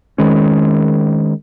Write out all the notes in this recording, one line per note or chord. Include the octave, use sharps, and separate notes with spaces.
D#3 G#3 C#4